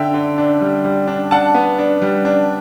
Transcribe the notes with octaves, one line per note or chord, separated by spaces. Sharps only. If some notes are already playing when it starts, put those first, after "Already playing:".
Already playing: D3 E5 G5
D3
D4
G3
G3
D4
D4 F#5 A5
B3
D4
G3
D4